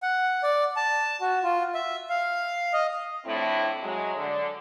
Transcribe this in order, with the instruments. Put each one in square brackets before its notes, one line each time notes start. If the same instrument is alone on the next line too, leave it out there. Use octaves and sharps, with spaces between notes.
[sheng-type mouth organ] F#5
D5
A5
F#4
F4
E5
F5
D#5
[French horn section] F2 A2 A3 C4 D4 E4
F#3 G#3
D3